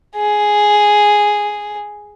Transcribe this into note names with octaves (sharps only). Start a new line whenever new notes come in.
G#4